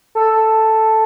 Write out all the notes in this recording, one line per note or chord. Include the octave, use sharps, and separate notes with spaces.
A4